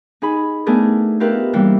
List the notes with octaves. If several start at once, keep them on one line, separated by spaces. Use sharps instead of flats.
D#4 G#4 B5
A3 B3 D4 G#4 A#4
D#4 F4 G4 A#4 B4 E5
C3 E3 G3 A#3